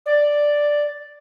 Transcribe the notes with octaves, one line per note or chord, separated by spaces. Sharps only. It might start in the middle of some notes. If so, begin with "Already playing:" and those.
D5